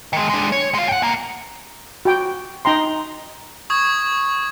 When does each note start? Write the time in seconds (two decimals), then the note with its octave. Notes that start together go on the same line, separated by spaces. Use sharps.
0.13 D#3 G#3
0.30 G#3 D4
0.52 C#5
0.74 G#3 F5
0.89 F#5 G5
1.02 C2 A#3
2.05 F#4 G5
2.65 D#4 G5 A#5 C6
3.70 C#6 D#6 G#6